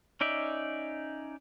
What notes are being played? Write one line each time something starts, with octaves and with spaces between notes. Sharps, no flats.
C#4 D#4 D5 E5